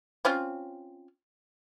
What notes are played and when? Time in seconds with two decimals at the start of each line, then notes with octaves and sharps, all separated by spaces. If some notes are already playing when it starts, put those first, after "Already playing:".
0.25 C4 C#4 F4